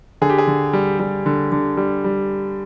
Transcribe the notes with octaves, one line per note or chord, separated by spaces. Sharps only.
D3 G#4
G4
G#4
D3
G3
G3
D3
D3
G3
G3